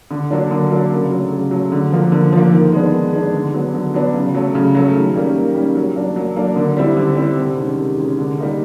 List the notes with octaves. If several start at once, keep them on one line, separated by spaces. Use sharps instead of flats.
D3
F#3 A#3 D4
D3
F#3 A#3 D4
C#3
F#3 A3
C#3
F#3 A3
D3
F3 A#3
D3
F3 A#3
D#3
G#3 B3 D4
D#3
G#3 B3 D4
D3
F#3 B3 D4
D3
F#3 B3 D4
C#3
F#3 A3
C#3
F#3 A3
D#3
G3 A#3 C#4
D#3
G3 A#3 C#4
F#3
A#3 D4
F#3
A#3 D4
D3
G3 C4 E4
D3
G3 C4 E4
C3
D#3 G#3 C#4
C3
D#3 G#3 C#4
D3
G3 A#3 D#4